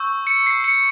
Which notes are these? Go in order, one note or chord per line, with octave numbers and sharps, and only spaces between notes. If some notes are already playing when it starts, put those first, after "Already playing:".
Already playing: C#6 E6 G6
C#7
C7
C#7